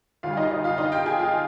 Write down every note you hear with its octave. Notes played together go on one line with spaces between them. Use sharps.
D2 D3 G3 F4 F5
F5
D#4 D#5
D#4 D#5
F4 F5
D#4 D#5
G4 G5
G#4 G#5
F4 F5